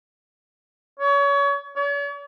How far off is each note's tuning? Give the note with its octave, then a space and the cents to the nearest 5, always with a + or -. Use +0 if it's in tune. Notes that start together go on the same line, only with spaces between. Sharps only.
C#5 +30
C#5 +45